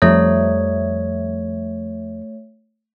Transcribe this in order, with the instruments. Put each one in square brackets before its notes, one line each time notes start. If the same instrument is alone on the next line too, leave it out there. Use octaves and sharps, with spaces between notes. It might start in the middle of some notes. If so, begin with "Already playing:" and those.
[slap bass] F2 F3 G3 [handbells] A3 C#5